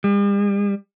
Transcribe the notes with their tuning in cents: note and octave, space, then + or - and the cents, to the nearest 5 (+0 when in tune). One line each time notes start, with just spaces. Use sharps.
G3 +45